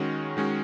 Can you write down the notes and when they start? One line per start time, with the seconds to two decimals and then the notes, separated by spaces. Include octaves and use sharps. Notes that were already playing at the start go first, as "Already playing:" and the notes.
Already playing: D#3 G#3 C#4 F#4
0.37 D#3 G#3 C#4 F#4